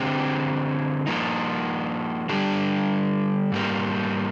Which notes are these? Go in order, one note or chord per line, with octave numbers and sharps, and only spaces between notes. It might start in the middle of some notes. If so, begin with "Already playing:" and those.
Already playing: D3 G#3 C4 G4
F3 A#3 D#4
D3 G3 D4 G4
G#2 G3 A#3